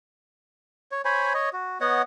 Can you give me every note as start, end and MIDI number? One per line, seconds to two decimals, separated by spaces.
0.92 1.02 73
1.05 1.33 72
1.05 1.33 73
1.05 1.33 80
1.05 1.33 83
1.34 1.49 73
1.34 1.49 75
1.53 1.78 66
1.81 2.02 59
1.81 2.02 73
1.81 2.02 75
1.81 2.02 78